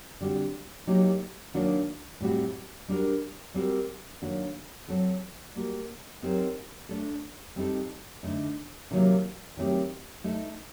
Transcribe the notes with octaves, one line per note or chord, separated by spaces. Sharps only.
D3 G3 C4 F#4
C3 F#3 A#3 D#4 G4
D#3 F#3 A#3 D4 F#4
A2 G3 C4 F#4
G3 D4 F#4 A#4
G3 C4 F#4 A#4
D#3 F#3 A#3 D4 F#4
F#3 C4 F#4 A4
G3 A#3 F#4 A#4
F#3 C4 D#4 G4 A#4
A3 D4 A4
G3 C4 D#4 A4
D3 A3 D#4
C3 D#3 F#3 A#3
D#3 F#3 A3 C4 G4
A3 D#4 A4